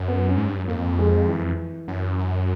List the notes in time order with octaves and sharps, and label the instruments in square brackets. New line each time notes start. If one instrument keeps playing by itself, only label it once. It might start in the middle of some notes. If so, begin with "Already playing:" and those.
Already playing: [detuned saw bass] F#2
[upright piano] B3
C#4
[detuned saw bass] G#2
G2
F#2
[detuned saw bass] F2 [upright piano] A#3
[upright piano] G#3
E3
[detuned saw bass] F#2